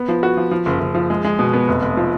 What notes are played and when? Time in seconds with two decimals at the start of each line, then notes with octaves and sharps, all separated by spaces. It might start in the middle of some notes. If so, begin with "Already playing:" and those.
Already playing: B3
0.08 F3
0.23 F#4
0.37 F3
0.51 F3
0.66 F#1
0.80 F#1
0.95 F3
1.10 G#3
1.24 G#3
1.39 B2
1.53 B3
1.68 F1
1.82 F1
1.97 F3